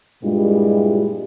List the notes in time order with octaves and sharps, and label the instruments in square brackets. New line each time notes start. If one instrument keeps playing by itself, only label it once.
[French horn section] G2 A#2 G#3 E4 F4 G4